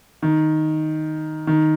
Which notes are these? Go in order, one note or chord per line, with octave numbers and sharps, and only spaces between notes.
D#3
D#3